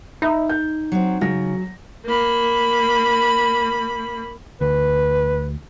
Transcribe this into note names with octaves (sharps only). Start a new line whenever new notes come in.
D#4 E5 B5
G6
F#3 C4
C#3 F#3 A#6
A#3 B5
D2 B4